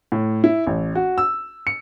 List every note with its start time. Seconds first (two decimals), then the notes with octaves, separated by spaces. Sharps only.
0.12 A2
0.44 E4
0.67 A1
0.95 F#4
1.18 E6
1.67 C#7